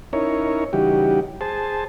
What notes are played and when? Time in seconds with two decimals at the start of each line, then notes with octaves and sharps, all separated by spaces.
0.13 C#4 D#4 E4 A#4 C#5
0.73 C#3 E3 G3 D#4 F#4 G4
1.41 G#4 C5 A5